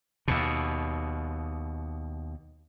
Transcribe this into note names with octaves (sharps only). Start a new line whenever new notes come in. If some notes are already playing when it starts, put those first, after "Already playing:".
D#2 B2